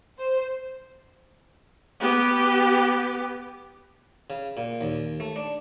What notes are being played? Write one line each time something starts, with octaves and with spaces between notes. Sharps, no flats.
C5
B3 G4
C#3
A#2
D#2
A3
D4